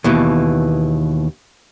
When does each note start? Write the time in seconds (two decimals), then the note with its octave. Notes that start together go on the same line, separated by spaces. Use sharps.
0.04 D#2 B2 E3